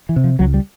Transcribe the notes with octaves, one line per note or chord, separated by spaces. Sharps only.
E3
C3
F3
C#2 F#3
G3